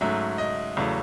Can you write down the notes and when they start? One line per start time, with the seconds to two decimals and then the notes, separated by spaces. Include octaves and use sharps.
0.01 G#2 F#3 A3 C#4 E5
0.38 D#5
0.77 E2 C#3 F#3 A3